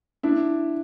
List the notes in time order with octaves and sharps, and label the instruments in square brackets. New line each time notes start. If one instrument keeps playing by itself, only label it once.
[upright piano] D4 E4